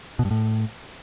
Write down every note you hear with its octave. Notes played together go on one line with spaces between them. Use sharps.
B2
G2
A2